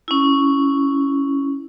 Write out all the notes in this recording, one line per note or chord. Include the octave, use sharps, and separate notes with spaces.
C#4 E4